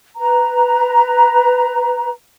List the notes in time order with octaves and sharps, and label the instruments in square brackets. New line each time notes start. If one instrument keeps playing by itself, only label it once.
[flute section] B4 A#5